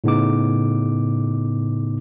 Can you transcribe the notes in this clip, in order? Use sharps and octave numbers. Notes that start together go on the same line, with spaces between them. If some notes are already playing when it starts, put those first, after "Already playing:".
A2 C#3 B3 D#4 D6